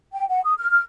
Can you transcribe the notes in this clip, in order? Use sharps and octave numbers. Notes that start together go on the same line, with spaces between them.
G5
F#5
D#6
F6
F6